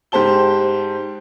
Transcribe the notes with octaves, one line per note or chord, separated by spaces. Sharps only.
G#2 G4 C5 A5 G7